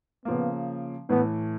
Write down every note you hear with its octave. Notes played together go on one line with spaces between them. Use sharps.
C#3 F3 A#3 B3
A2 E3 A3 B3